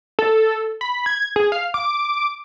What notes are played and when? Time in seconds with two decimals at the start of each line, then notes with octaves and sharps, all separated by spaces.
0.19 A4
0.81 B5
1.06 G#6
1.36 G#4
1.52 F5
1.74 D6